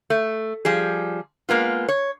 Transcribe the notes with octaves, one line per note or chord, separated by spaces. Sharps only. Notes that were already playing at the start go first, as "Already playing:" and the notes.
A3
F3 G3 G#4
G#3 A#3 B3 F4
C#5